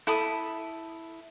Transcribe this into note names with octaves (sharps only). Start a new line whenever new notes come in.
E4 A4 B5 D#6